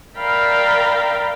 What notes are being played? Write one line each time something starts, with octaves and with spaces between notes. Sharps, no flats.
A#4 D5 E5 F5 G5 B5